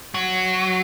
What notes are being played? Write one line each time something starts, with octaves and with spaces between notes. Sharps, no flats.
F#3